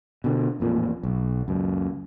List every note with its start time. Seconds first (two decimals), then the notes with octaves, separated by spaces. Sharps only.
0.24 B2 D3
0.60 A1 F2 A#2
1.03 B1
1.48 C#2 F#2